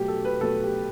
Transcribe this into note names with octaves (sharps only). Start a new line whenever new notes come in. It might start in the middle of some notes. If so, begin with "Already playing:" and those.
Already playing: B2 F#3 A3 G4
A4
B4
B2 F#3 A3 A4
G4